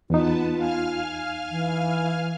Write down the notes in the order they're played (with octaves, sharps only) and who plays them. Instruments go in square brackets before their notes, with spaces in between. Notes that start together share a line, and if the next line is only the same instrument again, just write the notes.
[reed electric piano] E2 D#4 [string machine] B3 B4 A5 [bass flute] F4
[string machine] F5 G#5 F6
[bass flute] E3